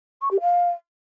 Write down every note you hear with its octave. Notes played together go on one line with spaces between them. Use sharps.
C#6
G4
F5